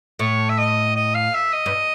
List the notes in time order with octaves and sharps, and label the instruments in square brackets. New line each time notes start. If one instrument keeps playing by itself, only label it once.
[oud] A2 [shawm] C#5
[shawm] E5
D#5
D#5
F5
E5
D#5
[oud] G2